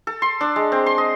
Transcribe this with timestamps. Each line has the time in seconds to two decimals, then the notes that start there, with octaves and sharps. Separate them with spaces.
0.07 A4
0.22 C6
0.41 D4
0.56 G#3
0.72 C4
0.86 C6
0.98 D#5